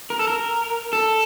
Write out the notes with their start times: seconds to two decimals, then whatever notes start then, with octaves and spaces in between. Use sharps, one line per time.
0.10 A#4
0.19 A4
0.27 A#4
0.93 A4